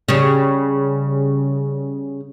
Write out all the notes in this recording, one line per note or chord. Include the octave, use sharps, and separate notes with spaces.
C#3 G3